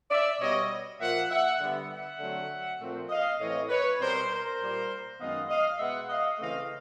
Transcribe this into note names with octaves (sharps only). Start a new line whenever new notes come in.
D5 E5
B2 G3 B3 C#5 D#5
A#2 F3 A#3 E5 F#5
E5 F#5
D3 G3 B3
E5 F#5
D3 F#3 A3 C4
A#2 F3 A3 C4
D#5 F5
A2 E3 A3 C4 C#5 D#5
B4 C#5
B2 G3 C4 A#4 C5
A#4 C5
A#2 G3 A#3
F#2 D#3 G#3 B3 D#5 F5
D#5 F5
B2 G#3 B3 E5 F#5
D#5 F5
C#3 E3 A3 C4 D#5 F5